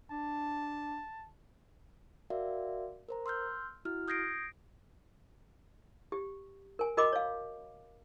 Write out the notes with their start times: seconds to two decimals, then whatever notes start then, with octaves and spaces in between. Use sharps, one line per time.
0.11 D4 A5
2.30 F#4 A#4 D5 E5 F5
3.09 A#4 C5 A#5
3.26 C6 E6 F6 G6
3.85 E4 F#4 F6
4.08 D#6 G6 G#6 A#6 C7 D7
6.12 G4
6.79 A#4 G#5
6.97 F#4 A#4 D#5 B5 D6
7.13 C#5 F5